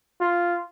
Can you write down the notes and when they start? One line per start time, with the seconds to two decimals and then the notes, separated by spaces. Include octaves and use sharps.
0.21 F4